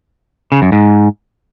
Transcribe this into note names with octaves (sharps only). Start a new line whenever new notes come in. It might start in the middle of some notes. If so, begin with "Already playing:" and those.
C#3
F#2
G#2